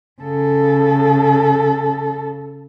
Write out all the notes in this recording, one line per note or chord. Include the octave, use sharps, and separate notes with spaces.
C#3 A4